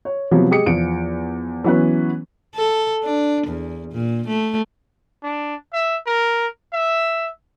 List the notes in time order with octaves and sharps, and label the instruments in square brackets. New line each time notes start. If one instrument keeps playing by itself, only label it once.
[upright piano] C#5
C3 F3 F#3 B3
G#3 G4 D#6 C#7
E2 F3 D7
E3 F#3 B3 C#4 B4
[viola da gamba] A4
D4
E2
A#2
A3
[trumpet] D4
E5
A#4
E5